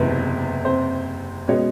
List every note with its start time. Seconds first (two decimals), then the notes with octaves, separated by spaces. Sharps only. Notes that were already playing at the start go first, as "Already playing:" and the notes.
Already playing: F#1 E2 C3 B3 B4
0.65 C4 C5
1.48 B2 G#3 B3 C#4 C#5